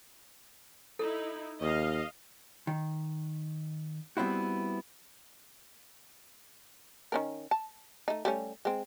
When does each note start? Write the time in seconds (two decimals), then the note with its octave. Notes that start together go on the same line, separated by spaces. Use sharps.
0.99 D#4 E4 A4
1.61 D#2 D#5 F5
2.67 D#3
4.17 G3 B3 C4 E4 F#4
7.12 D#3 C#4 A#4
7.51 A5
8.08 A3 D#4
8.25 G3 A3 C#4
8.65 G#3 C4